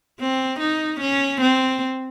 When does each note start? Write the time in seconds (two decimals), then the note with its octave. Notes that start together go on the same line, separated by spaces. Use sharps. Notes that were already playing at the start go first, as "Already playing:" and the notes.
0.20 C4
0.60 D#4
1.01 C#4
1.41 C4